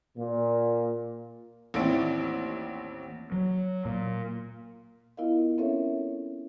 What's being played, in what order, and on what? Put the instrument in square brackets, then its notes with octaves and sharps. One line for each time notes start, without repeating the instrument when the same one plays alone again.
[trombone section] A#2
[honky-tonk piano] A1 D#2 C4 E4 D5 D7
[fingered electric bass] F#3
A#2
[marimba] B3 E4 F4 A#4 D#5 F5
C4 C#4 A4 A#4 C#5 E5